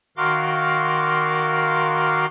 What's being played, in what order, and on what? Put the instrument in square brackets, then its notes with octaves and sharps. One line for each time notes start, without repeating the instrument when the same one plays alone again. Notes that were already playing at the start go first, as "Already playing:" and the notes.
[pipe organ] D#3 F#4 A#4 F5 C6 D6